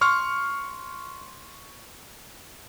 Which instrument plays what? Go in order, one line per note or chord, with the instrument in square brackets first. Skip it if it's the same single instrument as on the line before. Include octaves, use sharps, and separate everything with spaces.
[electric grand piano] C6 C#6 F6